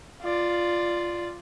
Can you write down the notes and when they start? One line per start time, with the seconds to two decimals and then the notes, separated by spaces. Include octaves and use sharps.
0.22 F4 D5